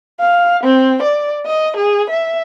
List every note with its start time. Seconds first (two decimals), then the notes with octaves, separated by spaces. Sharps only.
0.20 F5
0.64 C4
1.03 D5
1.46 D#5
1.77 G#4
2.10 E5